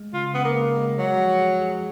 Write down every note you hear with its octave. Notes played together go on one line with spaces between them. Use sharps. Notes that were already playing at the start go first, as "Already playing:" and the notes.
Already playing: G#3
C#3 F4
C#3 B3
A#3
G#3
G#3
F#3 G#3
F3
G#4
G#4